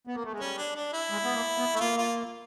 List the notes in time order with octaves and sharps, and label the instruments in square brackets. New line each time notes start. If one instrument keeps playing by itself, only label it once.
[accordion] B3
A#3
A3
G#3
[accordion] G3 [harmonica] C#4
[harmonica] D4
D4
E4
[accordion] G#3
B3
A#3
B3
A3
[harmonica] E4
[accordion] A#3 [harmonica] F4
[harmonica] F4